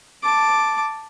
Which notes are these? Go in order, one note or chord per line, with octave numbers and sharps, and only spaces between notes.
A5 D6